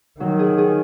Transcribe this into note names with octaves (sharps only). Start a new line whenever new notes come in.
D#3 F#3
G#4
G#4